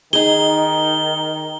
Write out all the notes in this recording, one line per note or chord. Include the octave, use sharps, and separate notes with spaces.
D#3 D#4 G#4 G7